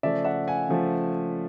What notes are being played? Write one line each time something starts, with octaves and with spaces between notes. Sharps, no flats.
C#3 F3 A3 D5 E5
E5 F#5
F#5 G#5
C#3 F3 A3